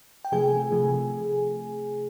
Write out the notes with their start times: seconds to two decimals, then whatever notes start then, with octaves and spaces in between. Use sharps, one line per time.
0.25 G5
0.32 C3 F3 A3 G#4 G#5
0.72 C3 F3 A3